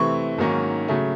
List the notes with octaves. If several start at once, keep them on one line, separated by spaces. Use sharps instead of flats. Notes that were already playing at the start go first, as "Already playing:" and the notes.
Already playing: C3 E3 A3 C4 C#6
G#2 D#3 F#3 A#3 C#4
C#3 F#3 A3